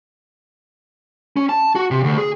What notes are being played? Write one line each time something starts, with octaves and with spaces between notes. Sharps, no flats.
C#4
A5
F#4
C3
D2
G#4